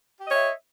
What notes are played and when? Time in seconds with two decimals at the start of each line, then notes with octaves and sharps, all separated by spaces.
0.21 G4
0.25 D#5
0.30 C#5
0.34 E5